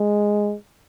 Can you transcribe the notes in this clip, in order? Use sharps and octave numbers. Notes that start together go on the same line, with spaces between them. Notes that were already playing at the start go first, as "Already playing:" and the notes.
Already playing: G#3